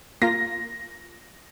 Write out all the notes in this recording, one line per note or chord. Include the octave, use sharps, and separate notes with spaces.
A#3 F4 A#6